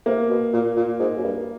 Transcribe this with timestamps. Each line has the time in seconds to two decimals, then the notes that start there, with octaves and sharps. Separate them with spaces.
0.06 C3 A#3
0.29 B2
0.53 A#2
0.77 A#2
1.00 G#2
1.17 F#2
1.24 G2